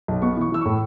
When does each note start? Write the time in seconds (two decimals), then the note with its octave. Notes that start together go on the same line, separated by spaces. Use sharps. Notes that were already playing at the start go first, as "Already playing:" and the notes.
0.08 B1
0.22 B3 C#6
0.37 E3 C#6
0.52 E3 E6
0.61 A2 C#6